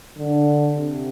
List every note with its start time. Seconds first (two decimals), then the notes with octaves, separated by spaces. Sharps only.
0.17 D3
0.76 C3